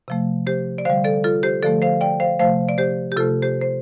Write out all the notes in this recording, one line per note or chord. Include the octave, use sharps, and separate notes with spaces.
C3 F3 A3
G4 C5
D5
D3 G3 C5 F5
A4 D5
F4 A4
G4 C5
D3 F3 A3 A4 D5
C5 F5
D5 G5
C5 F5
C3 F3 A3 C5 F5
D5
G4 C5
G4
C3 A3 F4 A4
G4 C5
C5